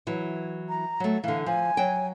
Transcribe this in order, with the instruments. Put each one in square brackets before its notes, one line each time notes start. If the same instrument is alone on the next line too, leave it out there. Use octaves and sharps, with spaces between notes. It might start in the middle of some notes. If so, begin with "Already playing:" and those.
[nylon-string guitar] E3 F#3 E4
[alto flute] A#5
[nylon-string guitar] F#3 A3
[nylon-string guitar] D3 E3 [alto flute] F5
[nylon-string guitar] F3 [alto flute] G#5
[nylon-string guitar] F#3 G5